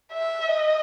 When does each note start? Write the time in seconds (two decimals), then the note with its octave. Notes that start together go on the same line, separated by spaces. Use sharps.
0.13 E5
0.52 D#5